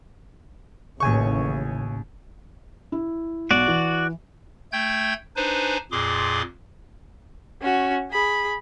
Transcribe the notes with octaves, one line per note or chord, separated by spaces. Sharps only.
A1 D#2 C#3 G#5 C#6
E4
B1 F#4 D5
E3
A3 G5 G6 G#6
D4 D#4 B4 C5 G#5
F2 A#2 G#4 C6 D6
C#4 F#4
G#4 B5